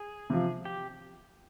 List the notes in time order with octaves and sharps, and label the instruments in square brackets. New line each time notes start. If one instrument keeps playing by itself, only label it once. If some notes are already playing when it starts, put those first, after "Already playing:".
Already playing: [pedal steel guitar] G#4
[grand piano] C3 F3
[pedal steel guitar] G4